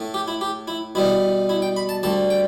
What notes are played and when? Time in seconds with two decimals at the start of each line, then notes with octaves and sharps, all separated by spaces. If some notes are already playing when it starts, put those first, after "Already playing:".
Already playing: A2 A3
0.14 G4
0.28 E4
0.41 G4
0.68 E4
0.95 B2 G3 B3 E4
1.49 E4
1.62 G5
1.76 B5
1.89 A5
2.03 D2 D3 G3 A5
2.30 G5